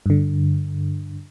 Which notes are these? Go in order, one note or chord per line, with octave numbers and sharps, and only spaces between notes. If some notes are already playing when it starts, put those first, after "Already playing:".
G2 D3